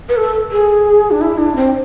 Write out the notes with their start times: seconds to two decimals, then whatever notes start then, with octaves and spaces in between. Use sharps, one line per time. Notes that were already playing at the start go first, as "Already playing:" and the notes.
0.09 B4
0.17 A4
0.52 G#4
1.11 D4
1.21 E4
1.38 D4
1.56 C4